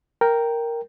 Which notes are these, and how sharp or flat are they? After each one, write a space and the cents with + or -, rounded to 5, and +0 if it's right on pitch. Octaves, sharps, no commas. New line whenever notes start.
A#4 +0 G5 +0